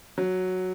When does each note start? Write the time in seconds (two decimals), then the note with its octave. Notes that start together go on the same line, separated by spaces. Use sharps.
0.18 F#3